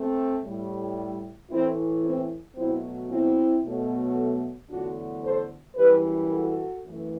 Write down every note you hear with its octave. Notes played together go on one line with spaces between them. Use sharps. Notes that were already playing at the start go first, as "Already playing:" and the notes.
Already playing: A3 C4
A2 G3
A2 E3 A3 C4 E4
C4 E4
B2 F#3 A3 C4 E4
C4 E4
B2 F#3 A3
E2 D3 F#3 A3 D4 F#4
A4 C5
F#2 E3 G3 G4 B4
F#4 A4
F#2 E3 A3